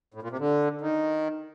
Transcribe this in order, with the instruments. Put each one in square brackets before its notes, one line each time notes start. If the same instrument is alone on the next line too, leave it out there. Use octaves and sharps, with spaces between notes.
[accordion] A2
A#2
C3
D3
D#3